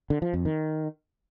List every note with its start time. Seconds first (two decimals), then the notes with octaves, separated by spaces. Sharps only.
0.10 D3
0.22 F3
0.34 F2
0.45 D#3